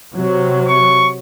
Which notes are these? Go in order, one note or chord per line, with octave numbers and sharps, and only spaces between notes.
C3 F#3
C#6